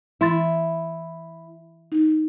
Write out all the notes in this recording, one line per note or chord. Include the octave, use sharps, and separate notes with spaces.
E3 E4 C6 A6
D#4